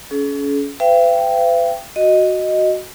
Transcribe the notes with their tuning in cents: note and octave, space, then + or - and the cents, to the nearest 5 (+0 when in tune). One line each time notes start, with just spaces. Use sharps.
C#4 +25 G#4 +45
B4 +45 E5 +45 G5 +0
F#4 +0 D#5 +0